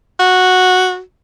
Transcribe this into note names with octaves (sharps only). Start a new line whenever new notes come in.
F#4